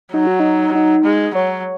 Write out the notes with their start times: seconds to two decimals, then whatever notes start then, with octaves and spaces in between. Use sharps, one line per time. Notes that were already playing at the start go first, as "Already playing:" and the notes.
0.14 F#3 D#4
0.27 F#4
0.40 D#4
0.75 D#4
1.04 G#3
1.35 F#3 C#5